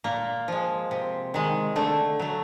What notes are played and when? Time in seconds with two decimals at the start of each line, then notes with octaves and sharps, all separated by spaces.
0.04 A#2 A#3
0.48 F3 G#3
0.91 C3
1.34 D#3 G#3
1.76 D3 A3
2.20 F#3 A3